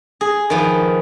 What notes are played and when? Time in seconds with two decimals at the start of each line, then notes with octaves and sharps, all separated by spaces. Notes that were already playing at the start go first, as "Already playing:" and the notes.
0.21 G#4
0.50 D#3 F3 B4